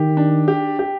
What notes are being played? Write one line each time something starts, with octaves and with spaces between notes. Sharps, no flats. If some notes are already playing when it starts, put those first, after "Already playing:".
Already playing: D#3 G4
D4
G4
G4